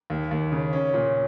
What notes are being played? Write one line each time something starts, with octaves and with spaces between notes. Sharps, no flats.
D#2
D#2
C#3
C#4
A#2